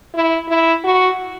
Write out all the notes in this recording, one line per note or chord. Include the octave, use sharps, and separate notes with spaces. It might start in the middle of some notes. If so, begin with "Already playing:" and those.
E4
E4
F#4